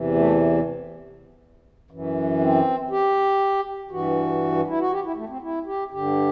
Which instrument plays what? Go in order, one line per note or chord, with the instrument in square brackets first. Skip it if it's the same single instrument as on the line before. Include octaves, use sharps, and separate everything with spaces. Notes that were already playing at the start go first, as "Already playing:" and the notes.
Already playing: [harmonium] E2 C3 E3
A3
F#2 E3
C4
G4
G2 E3 F#4
E4
F#4
G4
E4
A3
C4
E4
G4
G2 D3 G4